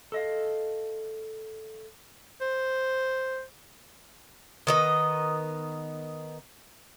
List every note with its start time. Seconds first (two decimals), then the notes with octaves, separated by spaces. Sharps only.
0.12 A4 D#5 F5
2.41 C5
4.67 D#3 B3 D#5